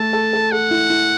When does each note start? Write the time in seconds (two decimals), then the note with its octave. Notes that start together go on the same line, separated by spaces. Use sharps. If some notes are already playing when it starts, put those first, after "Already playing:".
Already playing: A3 A4 A5
0.13 A4
0.33 A4
0.52 A4 F#5
0.71 E4
0.90 E4